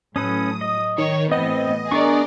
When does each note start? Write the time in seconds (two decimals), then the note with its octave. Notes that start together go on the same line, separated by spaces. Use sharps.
0.16 A2 F#3 C#4 A4 B4 D#6
0.61 D#5
0.98 D#3 C#5
1.31 A2 E3 B3 C4 D#5
1.91 B3 D4 G#4 A#4 D5 C#6